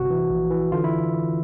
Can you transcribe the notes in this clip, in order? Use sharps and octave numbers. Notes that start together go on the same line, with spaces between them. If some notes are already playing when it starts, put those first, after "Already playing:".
Already playing: G1 C3 F#4
E3
A#1
E3
D3 F4
E4